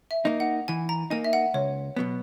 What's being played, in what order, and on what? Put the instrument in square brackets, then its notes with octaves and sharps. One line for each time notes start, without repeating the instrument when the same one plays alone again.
[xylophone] E5
[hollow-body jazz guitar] A#3 D#4
[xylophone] F#5
[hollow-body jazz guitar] E3 [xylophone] G#5
[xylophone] A#5
[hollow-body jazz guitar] A#3 D#4 [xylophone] G#5
[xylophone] E5
F#5
[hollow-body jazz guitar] C#2 [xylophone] C#5
[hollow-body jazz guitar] B2 F#3 B3